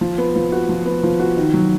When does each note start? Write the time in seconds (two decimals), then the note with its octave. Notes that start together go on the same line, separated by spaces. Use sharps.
0.01 F3
0.18 B3
0.36 F3
0.52 F#4
0.69 F3
0.86 B3
1.03 F3
1.20 F#4
1.37 D#3
1.54 F#3